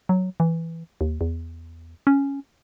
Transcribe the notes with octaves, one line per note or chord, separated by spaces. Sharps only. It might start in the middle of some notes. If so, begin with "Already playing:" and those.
F#3
E3
D#2
E2
C#4